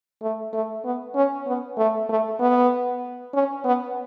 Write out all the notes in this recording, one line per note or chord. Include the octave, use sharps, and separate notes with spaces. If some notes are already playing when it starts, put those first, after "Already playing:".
A3
A3
B3
C#4
B3
A3
A3
B3
C#4
B3